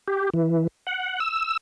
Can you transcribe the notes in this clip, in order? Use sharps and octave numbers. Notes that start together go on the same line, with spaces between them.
G4
E3
F#5
E6